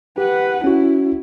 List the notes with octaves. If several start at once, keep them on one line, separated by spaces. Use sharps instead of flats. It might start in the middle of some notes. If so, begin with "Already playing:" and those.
G4 B4 F#5
C#4 E4 F#4